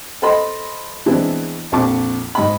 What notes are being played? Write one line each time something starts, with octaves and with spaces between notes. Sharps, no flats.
A4 C5 D#5 B5 C6
E3 G#3 B3 C4 D4 E4
A#1 F2 A5 C#6 D6
G#2 D#5 B5